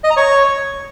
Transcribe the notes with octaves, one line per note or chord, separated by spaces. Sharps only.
D#5
A#5
C#5